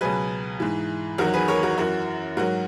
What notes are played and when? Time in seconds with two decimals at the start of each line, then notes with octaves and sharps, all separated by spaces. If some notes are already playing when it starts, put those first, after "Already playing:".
0.01 C#2 B2 F#3 G#4 B4
0.60 G#2 E3
1.18 E2 D#3 F#3 F#4 A#4
1.33 G#4 B4
1.48 A#4 C#5
1.63 F#4 A#4
1.78 F#2 E3 F#4 A#4
2.37 G#2 F#3 F#4 A#4